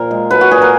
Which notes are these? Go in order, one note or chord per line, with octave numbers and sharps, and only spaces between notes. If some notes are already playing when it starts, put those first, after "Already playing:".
Already playing: A#2 F3 A#4
G#3
F#3 B4
F#4
A#2 G#4
A#4